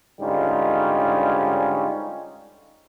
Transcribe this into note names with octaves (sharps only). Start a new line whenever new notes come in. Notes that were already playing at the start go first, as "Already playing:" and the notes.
G#2 D3 G3 C#4 D#4 F4